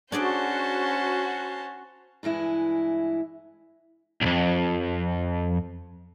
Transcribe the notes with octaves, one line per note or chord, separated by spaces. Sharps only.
C#4 D4 F#4 G#4 C5 D5 A5
G2 E3 G#3 E4
B1 F2